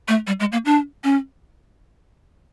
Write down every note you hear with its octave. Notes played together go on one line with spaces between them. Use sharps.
A3
G3
G#3
A#3
D4
C#4